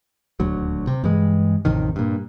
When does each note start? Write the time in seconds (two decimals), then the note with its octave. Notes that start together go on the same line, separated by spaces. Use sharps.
0.40 D#1 D2 F#3
0.87 C3
1.04 G2 E3 G#3
1.65 A1 F2 C3 D#3
1.96 G2 A#2